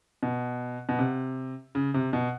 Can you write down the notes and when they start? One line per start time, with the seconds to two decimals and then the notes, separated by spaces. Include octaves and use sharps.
0.23 B2
0.89 B2
0.99 C3
1.75 C#3
1.94 C3
2.13 B2